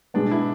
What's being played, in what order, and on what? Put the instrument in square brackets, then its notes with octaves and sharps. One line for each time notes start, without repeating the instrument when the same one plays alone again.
[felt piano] B2 G#3 B3 [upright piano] D4
[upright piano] E4